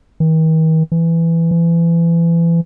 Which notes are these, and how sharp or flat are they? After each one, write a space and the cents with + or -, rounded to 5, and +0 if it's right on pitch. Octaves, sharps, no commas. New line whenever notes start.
D#3 +45
E3 +10
E3 +30